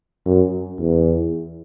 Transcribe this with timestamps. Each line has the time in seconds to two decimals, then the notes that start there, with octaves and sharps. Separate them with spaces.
0.26 F#2
0.79 E2